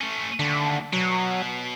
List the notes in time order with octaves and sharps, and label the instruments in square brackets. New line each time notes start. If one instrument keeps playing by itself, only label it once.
[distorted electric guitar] A3 C#4
[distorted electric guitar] D#2 A3 [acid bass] D3
[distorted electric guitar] B2 [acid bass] F#3